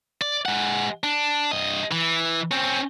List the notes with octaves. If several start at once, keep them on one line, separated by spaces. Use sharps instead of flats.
D5
G#3 F#5
D4
G2 D#5
E3
C4 C#4